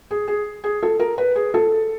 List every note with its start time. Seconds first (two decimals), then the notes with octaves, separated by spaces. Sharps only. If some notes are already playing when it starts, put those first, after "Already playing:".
0.11 G#4
0.28 G#4
0.64 G#4
0.83 A4
0.99 A#4
1.18 B4
1.36 G#4
1.54 A4